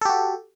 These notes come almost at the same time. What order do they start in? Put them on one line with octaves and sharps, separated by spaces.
A4 G4 F#4